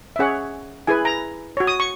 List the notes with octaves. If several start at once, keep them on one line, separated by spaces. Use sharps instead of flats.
E5
C#4 G#4 C#5 F#5
E4 G#4 B4 G#5
A#5
F#4 C#5
D#6
C#6